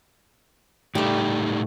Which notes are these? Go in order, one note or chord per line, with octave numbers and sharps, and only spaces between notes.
A2 G3 A3 D#4 G4